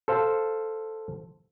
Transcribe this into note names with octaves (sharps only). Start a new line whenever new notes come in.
A4 C5 F5